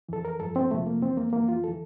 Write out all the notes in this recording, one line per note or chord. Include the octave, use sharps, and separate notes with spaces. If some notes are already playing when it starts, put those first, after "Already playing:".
F2 E3 A4
A#4
G2 F3 A4
C4
F2 C3 F3 A3
A#3
F2 E3 C4
A#3
F2 E3 A#3
F4
E3 A4